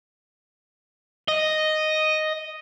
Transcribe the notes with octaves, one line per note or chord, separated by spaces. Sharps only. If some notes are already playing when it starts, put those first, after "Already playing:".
D#5